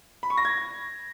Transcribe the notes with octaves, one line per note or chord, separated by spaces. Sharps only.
B5
C#6
A#6
G#6